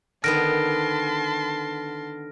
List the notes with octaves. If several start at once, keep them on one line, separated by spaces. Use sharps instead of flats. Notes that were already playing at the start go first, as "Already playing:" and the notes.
D3 D#3 B3 A5 C6 F6 A#6 D7